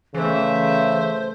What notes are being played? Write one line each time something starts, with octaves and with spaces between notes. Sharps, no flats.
C#3 E3 A3 C5 E5